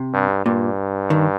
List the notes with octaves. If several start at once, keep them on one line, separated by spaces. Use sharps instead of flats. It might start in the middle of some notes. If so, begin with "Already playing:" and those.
Already playing: C3
G2
G2 A#2
D#3